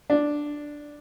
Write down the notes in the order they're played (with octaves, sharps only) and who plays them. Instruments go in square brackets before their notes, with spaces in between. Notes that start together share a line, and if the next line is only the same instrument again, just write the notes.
[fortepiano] D4